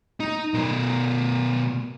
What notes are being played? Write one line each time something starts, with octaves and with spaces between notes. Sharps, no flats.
D#4
B2 A#4